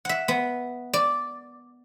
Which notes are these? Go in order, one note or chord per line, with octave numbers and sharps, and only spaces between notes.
E5 F#5
B3
D5